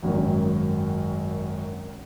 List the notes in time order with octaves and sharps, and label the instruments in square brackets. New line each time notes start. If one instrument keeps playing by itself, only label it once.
[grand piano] G#1 F#2 D#3